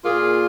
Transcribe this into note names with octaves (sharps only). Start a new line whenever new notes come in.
A#2 A#3 F4 G#4 F5